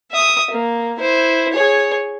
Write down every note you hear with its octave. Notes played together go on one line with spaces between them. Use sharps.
E5 D#6
A#3
E4 C5
G#4 C#5